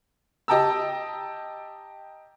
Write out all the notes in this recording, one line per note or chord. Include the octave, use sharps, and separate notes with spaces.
G4 D#5 G5 A5 A#5 E6